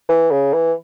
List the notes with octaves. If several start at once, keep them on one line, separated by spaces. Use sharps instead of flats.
E3
C#3
E3